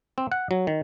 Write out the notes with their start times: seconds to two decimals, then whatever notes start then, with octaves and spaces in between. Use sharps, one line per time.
0.18 C4
0.32 F#5
0.51 F#3
0.67 D#3